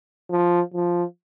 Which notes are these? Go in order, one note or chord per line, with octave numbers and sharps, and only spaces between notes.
F3
F3